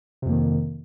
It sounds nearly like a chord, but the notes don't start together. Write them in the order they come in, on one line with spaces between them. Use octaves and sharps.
C3 F2 A#3 D#3